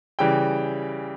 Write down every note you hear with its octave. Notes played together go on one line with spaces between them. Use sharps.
C#3 E3 G3 G5